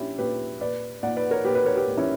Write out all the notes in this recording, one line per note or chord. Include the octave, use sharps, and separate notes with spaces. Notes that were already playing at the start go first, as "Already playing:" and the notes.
Already playing: A#2 C#4 D4 E4 G4
A#2 G4 B4
A#2 B4 D5
A#2 D5 F#5
B4 D5
A#4 C#5
A#2 G4 B4
G4 B4
A#4 C#5
G4 B4
A#2
C#4 E4